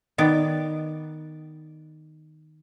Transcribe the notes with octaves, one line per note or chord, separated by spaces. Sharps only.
D#3 B3 D5